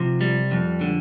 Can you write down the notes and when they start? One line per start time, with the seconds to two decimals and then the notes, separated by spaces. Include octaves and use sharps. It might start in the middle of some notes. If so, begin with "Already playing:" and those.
Already playing: C3 F3
0.21 G3
0.51 F2
0.81 D3